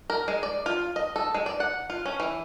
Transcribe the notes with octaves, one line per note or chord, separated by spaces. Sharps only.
A#4
G#3
D5
F4
D#5
A4
G#3
D5
F#5
F4
C#4
E3